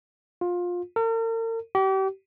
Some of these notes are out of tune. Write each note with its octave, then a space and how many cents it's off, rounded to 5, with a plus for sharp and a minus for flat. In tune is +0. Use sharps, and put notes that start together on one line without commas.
F4 +20
A#4 -45
G4 -35